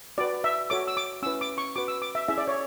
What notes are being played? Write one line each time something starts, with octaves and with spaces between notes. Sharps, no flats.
F#4 B4 D5
E5
F#4 A4 C#5 D6
E6
D6
C#4 E4 B4 E6
D6
C#6
F#4 B4 D6
E6
D6
E5
C#4 E4 G#4 E5
D5
C#5